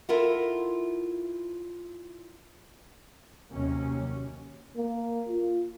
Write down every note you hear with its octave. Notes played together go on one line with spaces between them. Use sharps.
E4 F4 A4 A#4 E5 F#5
D#2 C3 F#3 A#3 C#4
A#3
F4